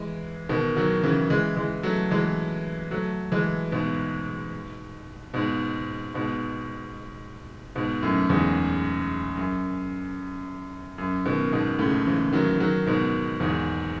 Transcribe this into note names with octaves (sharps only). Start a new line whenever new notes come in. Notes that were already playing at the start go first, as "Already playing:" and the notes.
Already playing: E3 G#3
B2 D#3
D#3 F#3
C#3 E3
E3 G#3
E3 G#3
F#3 A3
E3 G#3
F#3 A3
E3 G#3
G#2 B2
G#2 B2
G#2 B2
G#2 B2
F#2 A2
E2 G#2
F#2
F#2
B2 D#3
G#2 B2
A2 C#3
C#3 E3
D#3 F#3
D#3 F#3
G#2 B2
E2 G#2